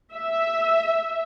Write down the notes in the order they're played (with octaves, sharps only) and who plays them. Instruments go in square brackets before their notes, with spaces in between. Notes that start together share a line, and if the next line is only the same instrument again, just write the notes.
[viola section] E5